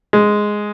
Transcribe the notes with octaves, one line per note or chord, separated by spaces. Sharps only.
G#3